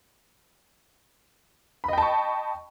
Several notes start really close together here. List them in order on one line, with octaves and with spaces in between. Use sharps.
B5 D#5 G5 A5 C#6